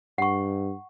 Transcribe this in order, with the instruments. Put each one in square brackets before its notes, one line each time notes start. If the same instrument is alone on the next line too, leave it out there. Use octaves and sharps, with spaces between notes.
[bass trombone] G2 [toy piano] F#5 C#6